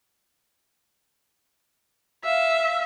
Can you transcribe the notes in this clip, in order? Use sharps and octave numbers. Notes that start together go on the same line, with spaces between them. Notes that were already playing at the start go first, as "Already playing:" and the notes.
E5 F5